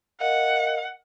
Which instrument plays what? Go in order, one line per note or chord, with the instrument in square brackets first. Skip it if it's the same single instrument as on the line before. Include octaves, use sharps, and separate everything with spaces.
[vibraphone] A#4 D#5 F5 [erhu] F#5